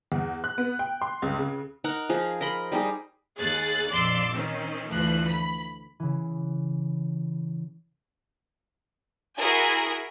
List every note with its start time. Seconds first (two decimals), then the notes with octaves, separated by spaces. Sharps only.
0.12 E2
0.44 F#6
0.58 B3
0.79 G5
1.02 C6
1.22 C#2
1.38 C#3
1.84 D#4 A#4 F#5 A#5
2.09 F3 G#4 F5
2.41 A#4 D#5 B5 C6
2.72 G3 D#4 G4 G#4
3.39 D#2 G#4 F#6 A6
3.92 A#1 F2 D5 C6 D6 E6
4.33 D#3 C4 C#4
4.90 D2 E3 F3 A3 F#6
5.25 B5
6.00 C#3 E3
9.38 E4 F#4 G#4 A#4 G#5